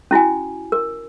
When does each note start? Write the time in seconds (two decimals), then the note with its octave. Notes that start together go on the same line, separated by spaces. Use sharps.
0.11 C#4 E4 F#4 G#5
0.72 A#4